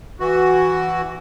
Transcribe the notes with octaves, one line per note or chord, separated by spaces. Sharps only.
E3 F#4